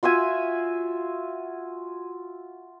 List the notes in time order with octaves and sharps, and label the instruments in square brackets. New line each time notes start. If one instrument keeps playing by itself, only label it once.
[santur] F4 F#4 E5 G#5